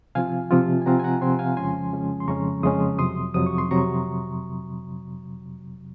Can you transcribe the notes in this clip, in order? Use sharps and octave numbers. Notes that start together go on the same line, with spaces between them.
C3 F3 C4 F4 F5 G#5
C3 F3 C4 F4
G#5
C3 F3 C4 F4 F#5 A#5
G#5
F#5 A#5
C3 F3 C4 F4 G#5 C6
F5 G#5
F2 C#3 F3 G#3 C#4 G#5 C6
F2 C#3 F3 G#3 C#4
C6
F2 C#3 F3 G#3 C#4 A#5 C#6
F2 C#3 F3 G#3 C#4 C6 D#6
F2 C3 F#3 C6 D#6
F2 C3 F#3 D#6
C#6
C6
F2 C3 F#3 A#5 C#6